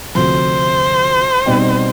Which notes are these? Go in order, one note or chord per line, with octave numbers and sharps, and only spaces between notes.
D2 C3 F3 C5
B2 G3 C4 D#4